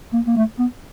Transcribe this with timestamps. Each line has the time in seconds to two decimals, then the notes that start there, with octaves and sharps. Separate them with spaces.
0.13 A#3
0.27 A#3
0.37 A3
0.59 B3